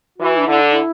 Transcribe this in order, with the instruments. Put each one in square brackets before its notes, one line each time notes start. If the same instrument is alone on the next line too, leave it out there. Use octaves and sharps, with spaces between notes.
[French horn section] E3 [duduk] F#4
[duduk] D4
[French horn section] D3 [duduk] E4
[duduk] D4
E4